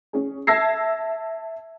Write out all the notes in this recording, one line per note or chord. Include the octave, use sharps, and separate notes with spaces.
C#4 G#4
E5 A5 E6 G#6 A#6 C7